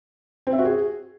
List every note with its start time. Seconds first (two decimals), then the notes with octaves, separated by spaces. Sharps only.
0.47 C4
0.53 E5
0.59 F#4
0.65 G#4